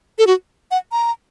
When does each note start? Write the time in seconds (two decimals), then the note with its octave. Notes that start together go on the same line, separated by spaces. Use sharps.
0.18 A4
0.27 F#4
0.71 F#5
0.92 A#5